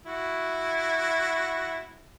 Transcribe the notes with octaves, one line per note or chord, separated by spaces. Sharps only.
E4 F#4